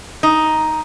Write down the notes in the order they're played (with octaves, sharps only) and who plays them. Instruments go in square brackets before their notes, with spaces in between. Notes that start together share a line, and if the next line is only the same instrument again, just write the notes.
[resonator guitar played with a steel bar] D#4